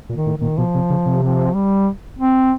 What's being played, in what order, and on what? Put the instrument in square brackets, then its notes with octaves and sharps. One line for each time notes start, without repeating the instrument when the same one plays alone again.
[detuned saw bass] A#2
[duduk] D#3
[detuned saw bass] A2
[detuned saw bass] A#2 [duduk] D#3
[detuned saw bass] B2 [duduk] F3
[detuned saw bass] C3
C#3
C3
[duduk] F3
G3
C4